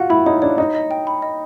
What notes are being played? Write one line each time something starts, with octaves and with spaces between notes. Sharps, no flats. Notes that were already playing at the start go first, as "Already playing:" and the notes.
Already playing: F4 F#4 F#5
E4 B5
D#4 C#5
D4 C#5
D#4 D#5
D#5
G5
B5
D#5